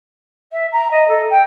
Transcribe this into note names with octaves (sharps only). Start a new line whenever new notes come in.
E5
A#5
D#5
A4
G5